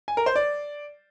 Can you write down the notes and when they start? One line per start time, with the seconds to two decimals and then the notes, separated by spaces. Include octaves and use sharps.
0.08 G#5
0.17 A#4
0.26 C5
0.36 D5